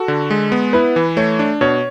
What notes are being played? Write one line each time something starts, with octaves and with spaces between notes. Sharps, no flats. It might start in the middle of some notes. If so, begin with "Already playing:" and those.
Already playing: F#4 A4
D3
G#3
B3
E4 B4
E3
A3 C#5
D4
B2 C#5